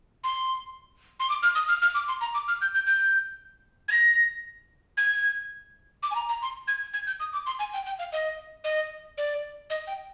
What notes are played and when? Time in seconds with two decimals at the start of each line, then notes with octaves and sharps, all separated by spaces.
0.24 C6
1.20 C6
1.30 D6
1.43 F6
1.55 D#6
1.68 F6
1.82 F6
1.95 D6
2.08 C6
2.21 A#5
2.34 D6
2.48 F6
2.61 G6
2.74 G6
2.86 G6
3.88 G#6
3.92 A#6
4.97 G#6
6.03 D6
6.11 G#5
6.15 A#5
6.29 A#5
6.42 C6
6.68 G#6
6.94 G#6
7.07 G6
7.20 D#6
7.33 D6
7.46 C6
7.59 G#5
7.73 G5
7.86 G5
7.99 F5
8.13 D#5
8.64 D#5
9.18 D5
9.70 D#5
9.87 G5